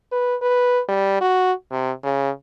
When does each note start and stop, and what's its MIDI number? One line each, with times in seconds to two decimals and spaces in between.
0.12 0.36 71
0.42 0.81 71
0.89 1.21 55
1.21 1.53 66
1.72 1.91 48
2.03 2.30 49